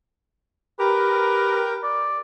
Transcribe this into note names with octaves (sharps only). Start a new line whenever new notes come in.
G4 A#4 B4
D5